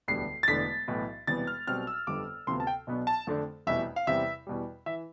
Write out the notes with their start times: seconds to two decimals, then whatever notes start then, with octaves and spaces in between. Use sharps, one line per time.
0.08 E1 D2 D3 G3 B3 C7
0.43 A6
0.48 E1 E2 D3 A3 D4 B6
0.88 B1 A2 E3 B3
1.27 E1 E2 C3 G3 B3 A6
1.47 F6
1.67 B1 B2 G3 C4 F6
1.87 E6
2.07 G1 F2 D3 G3 D6
2.47 D2 C3 F3 B3 C6
2.60 A5
2.67 G5
2.87 B1 B2 B3 D4
3.07 A5
3.27 F2 D3 A3 D4
3.67 F1 E2 B2 G3 E5
3.96 F5
4.07 E2 C3 G3 C4 E4 E5
4.47 E2 B2 G3
4.86 E3 E5